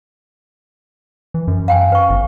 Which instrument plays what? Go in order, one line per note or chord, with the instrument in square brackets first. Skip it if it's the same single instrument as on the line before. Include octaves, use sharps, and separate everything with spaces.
[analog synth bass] E3
F#2
[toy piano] F5 G5 G#5
B4 C#6
[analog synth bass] G1